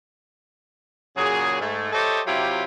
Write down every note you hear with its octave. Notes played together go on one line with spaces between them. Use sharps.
A#2 C#3 F#3 G#4
G#2 A3
G4 A4 C5 C#5 D#5 E5
C3 F#3 E4 F4 G4